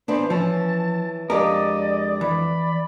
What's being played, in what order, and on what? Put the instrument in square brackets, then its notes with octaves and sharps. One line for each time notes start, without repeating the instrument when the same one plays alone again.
[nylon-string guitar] E3 B3 D4 [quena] C5
[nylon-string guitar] E3 C#4 [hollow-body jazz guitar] F3 [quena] A5
[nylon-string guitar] F2 D4 [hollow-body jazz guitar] G#3 G4 A#4 [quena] D5 [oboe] D#5
[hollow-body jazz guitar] E3 [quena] D5 [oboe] B5